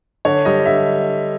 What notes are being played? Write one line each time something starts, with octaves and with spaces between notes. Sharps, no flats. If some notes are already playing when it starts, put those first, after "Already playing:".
D3 C#5
G3 D#5
D3 E5